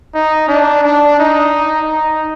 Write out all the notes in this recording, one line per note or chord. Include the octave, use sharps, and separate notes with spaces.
D#4
D4
D4
D#4
D#4